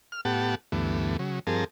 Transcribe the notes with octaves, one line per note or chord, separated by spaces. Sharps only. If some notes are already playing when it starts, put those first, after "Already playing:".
F6
A2 B3 G4 F#5 A5
D2 G2 E3 A3 B3
C#3 F#3
G2 F3 C4 G#4 A#4 A5